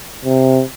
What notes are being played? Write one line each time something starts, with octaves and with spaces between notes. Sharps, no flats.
C3